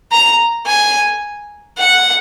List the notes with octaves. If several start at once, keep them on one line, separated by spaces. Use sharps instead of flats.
A#5
G#5
F#5